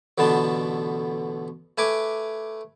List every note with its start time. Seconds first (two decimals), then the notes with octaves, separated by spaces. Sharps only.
0.18 A1 B2 D3 B3 A5
1.78 A3 B4 G#5 D6